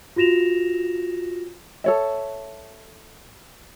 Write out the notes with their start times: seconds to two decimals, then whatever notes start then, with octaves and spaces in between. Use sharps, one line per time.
0.16 F4 F#4 A#6 E7 F7
1.84 A4 C#5 E5